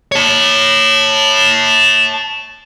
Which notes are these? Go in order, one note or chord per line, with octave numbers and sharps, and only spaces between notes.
C#5 A5